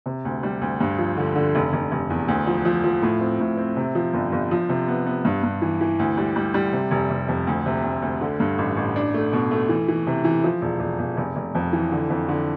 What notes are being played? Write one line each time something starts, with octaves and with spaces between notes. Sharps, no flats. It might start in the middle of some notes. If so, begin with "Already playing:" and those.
C3
D2
G3
D2
G2
F3
D3
D3
F1
F1
F1
E2
D2
F3
F3
F3
A2
C4
A2
C4
C3
F3
G1
G1
F3
C3
B3
B3
G2
G2
E3
E3
D2
G3
G3
G3
C3
F1
F1
F2
D2
C3
D2
D2
D3
G2
A1
A1
D4
A3
B2
A3
E3
E3
C3
E3
F3
E1
E1
E1
F1
F1
F2
E3
D3
F2
D3